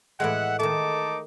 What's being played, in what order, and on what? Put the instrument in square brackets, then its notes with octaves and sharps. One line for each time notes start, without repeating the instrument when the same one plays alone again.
[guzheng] A2 E3 G#3 [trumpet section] E5 F#5
[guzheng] D#3 A3 [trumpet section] D#4 A5 D6